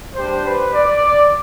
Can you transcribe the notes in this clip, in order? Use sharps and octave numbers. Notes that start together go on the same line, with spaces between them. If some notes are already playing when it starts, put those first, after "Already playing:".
G3 D4 G4 C5
B4
D5